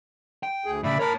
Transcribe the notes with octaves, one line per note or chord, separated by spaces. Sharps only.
G5
D2 G#4
A2 C#3 D5 E5 B5
A#4 C#5 A5 B5